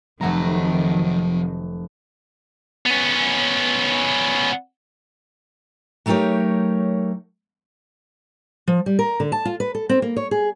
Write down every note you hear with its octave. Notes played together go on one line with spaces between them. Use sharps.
F1 C3 D#3 F3 F#3 A3 F#5 A#5
B3 C#4
F#3 A3 D#4 G4 A#4 C#5
F3
G3
A#4
D3
A5
F4
B4
A4
C4
A#3
C#5
G#4